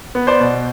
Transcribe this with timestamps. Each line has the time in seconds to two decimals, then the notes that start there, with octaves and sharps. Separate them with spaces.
0.15 B3
0.27 C5 D5
0.40 B2